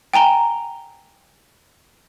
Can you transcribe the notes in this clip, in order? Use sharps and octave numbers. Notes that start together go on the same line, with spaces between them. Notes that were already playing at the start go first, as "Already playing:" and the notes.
G5 G#5 A#5 G7